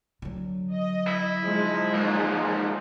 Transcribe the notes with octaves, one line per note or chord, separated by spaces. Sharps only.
D3 F#3
D#5
E4
F3 G#3 D#4
G#2 A#3